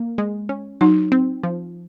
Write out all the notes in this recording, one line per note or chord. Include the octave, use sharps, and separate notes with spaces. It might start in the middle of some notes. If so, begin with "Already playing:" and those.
Already playing: A#3
G#3
C#4
F#3 D#4
C4
F3